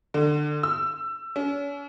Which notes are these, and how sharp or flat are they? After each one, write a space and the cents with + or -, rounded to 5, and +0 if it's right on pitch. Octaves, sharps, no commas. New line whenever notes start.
D3 +25
E6 +15
C#4 +40